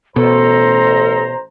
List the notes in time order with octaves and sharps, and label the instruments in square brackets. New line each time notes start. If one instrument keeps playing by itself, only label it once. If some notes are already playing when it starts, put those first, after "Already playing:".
[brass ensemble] A1 C5 A#5 [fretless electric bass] B2 [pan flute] A4